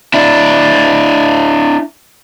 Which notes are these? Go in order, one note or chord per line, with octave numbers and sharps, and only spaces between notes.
D4 E4